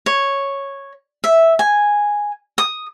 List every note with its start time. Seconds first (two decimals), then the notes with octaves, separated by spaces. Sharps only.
0.06 C#5
1.24 E5
1.59 G#5
2.58 D#6